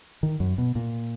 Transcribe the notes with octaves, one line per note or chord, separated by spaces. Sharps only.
D#3
F#2
B2
A#2